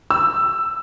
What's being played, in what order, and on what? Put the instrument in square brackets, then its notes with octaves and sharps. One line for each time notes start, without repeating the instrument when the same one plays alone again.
[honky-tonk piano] E6